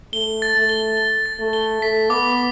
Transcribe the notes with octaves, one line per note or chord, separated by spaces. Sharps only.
A3 G7
A6
A3
G7
G7
A6
A3
G7
A3 B6
B3 D6